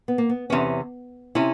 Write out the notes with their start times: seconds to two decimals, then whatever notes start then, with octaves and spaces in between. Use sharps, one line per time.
0.08 B3
0.18 A#3
0.29 B3
0.50 E2 C3 B3 C#4
1.35 C3 C#4 E4